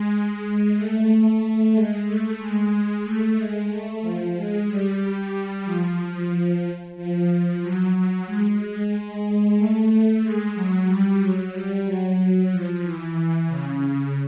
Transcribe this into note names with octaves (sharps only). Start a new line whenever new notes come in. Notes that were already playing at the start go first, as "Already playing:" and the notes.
Already playing: G#3
A3
G#3
A3
G#3
A3
G#3
A3
F3
G#3
G3
F3
F3
F#3
F#3
G#3
G#3
A3
G#3
F#3
G3
F#3
G3
F#3
F3
E3
C#3